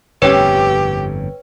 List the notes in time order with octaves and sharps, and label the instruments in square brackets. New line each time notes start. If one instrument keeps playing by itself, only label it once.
[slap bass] G1 F2 A2 [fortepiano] C#4 [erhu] G4 [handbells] B4 G5